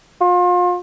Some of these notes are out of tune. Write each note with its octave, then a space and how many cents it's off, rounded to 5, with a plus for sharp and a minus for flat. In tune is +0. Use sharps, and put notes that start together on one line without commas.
F4 +35